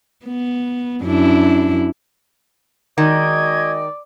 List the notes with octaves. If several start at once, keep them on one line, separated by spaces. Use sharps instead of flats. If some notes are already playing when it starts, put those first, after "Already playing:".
B3
F#2 D4 E4
D#3 G#3 F#4 D5 D#5 G#6